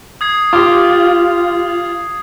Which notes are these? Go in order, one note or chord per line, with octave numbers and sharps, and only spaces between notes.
D#6 G#6 C7
F4 G4 D6